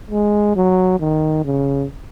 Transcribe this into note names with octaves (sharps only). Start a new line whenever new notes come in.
G#3
F#3
D#3
C#3